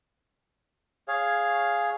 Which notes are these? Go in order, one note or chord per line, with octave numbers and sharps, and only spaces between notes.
G#4 C#5 F5